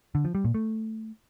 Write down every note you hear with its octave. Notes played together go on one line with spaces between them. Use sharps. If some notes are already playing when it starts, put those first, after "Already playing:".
D3
F3
G3
A#2
A3